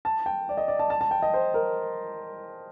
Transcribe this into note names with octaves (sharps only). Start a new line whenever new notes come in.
A5
G5
D5
D#5
D5
A5
A5
A5
G5
D#5
C5
A#4